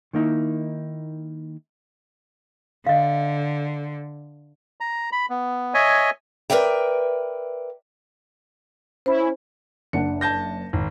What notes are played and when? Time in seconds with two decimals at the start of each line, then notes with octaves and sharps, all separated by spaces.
0.13 D#3 A#3 D#4 E4
2.86 D3 D#5 F5
4.81 A#5
5.12 B5
5.30 B3
5.74 C#5 D#5 E5 G#5
6.50 A#4 B4 D5 E5 G5
9.06 C#4 E4 C5 B5
9.93 F#1 D4 F#5 C#7
10.21 A5 G6 A#6
10.73 G#1